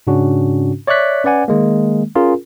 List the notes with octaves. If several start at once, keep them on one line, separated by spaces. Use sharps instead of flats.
G#2 C#3 C#4 D4 F#4
C#5 D5 E5 C#6 F#6 B6
C#4 B4 D5 F#5 G#5
D#3 G#3 A#3
C#4 F4 G#4 A#4